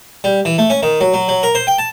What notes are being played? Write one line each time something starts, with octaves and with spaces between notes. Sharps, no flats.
G3
E3
A3
C#4
D#3
F#3
F#3
F#3
A#4
C5
G5
A5